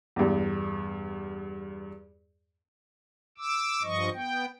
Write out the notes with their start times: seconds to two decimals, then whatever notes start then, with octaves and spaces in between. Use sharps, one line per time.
0.16 E2 G2
3.38 D6 E6
3.83 G2 F3 D#5 C#6
4.14 B3 G5